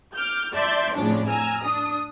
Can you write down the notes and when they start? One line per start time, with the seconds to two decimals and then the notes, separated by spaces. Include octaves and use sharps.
0.15 D6 F6 G6
0.54 D5 E5 A5 C6 D6 G6
0.95 F2 A2 C#3 F3 C#4 D4
1.27 G#5 A#5 E6 F6
1.63 D4 D#6